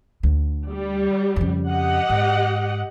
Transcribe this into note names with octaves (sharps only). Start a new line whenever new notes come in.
D2
G3
F2 C#3
G4 D#5 F#5
G#2